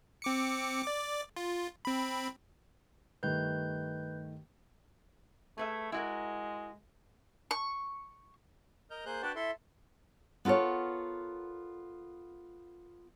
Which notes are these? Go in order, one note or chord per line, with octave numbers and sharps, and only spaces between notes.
C4 D6 C#7
D5 D6
F4
C4 B5
G2 D#3 A3 B4 G6
A3 G#4 B4 E5
G#3 E4 F#4 A#4
C#6
A#4 D#5 F6 G6
A#3 G#4 C5 F#6 G6
D4 F#4 B4 D5 G5 A5
E4 A4 E5 C6
B3 F4 A4 A#4 C#5